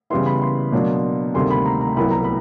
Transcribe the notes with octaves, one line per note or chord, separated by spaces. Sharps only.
C#3 E3 G3 B3 E4 C6
B5
C6
B2 F#3 A#3 D4
D2 C3 D#3 G3 A#3 C6
B5
A#5
A#5
C2 A#2 F#3 B3 E4 B5
A#5
B5